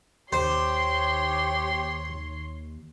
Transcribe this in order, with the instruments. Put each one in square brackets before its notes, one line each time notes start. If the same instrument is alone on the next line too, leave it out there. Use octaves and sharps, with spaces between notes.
[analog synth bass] D#2 [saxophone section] G4 [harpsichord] C5 [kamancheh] C#5 C6